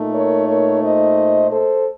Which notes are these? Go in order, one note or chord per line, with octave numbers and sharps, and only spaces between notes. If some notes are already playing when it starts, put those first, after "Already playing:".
Already playing: A#2 A3 D#4
A#4 C#5
A#4 C#5
C5 D#5
A4 C5